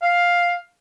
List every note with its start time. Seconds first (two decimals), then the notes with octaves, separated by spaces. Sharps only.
0.02 F5